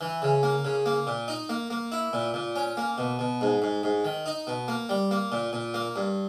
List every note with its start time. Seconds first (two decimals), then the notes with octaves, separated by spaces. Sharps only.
0.01 E3
0.22 C#3
0.43 A#3
0.65 C#3
0.86 A#3
1.07 A#2
1.28 D#4
1.49 A#3
1.70 A#3
1.92 E4
2.13 A#2
2.34 A#2
2.56 C#4
2.77 A#3
2.98 B2
3.19 B2
3.41 G#2
3.62 G#2
3.83 G#2
4.05 D#3
4.26 D#4
4.47 B2
4.68 A#3
4.89 G3
5.11 A#3
5.32 A#2
5.53 A#2
5.74 A#3
5.96 G2